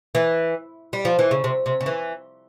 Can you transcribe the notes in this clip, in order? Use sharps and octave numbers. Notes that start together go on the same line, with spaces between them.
E3
G3
F3
E3
C#3
C3
C3
C#3
E3